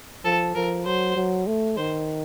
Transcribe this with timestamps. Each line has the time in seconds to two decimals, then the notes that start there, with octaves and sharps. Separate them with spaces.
0.25 F3 A4
0.55 F3 A#4
0.86 F#3 C5
1.16 F#3
1.47 A3
1.77 D#3 C5